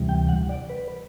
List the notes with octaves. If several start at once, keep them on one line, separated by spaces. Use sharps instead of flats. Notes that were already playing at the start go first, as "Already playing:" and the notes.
Already playing: D2 C3 E3 G3
G5
F#5
D5
B4